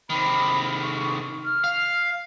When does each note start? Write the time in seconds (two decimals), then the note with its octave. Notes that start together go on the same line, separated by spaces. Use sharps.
0.10 C3 D#3 B5
0.83 C#6
1.45 F6
1.64 F5